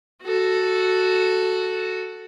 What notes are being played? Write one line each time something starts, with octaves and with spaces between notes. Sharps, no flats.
F#4 A4